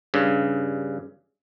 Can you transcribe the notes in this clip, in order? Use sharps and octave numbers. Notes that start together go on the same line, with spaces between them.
G2 C#3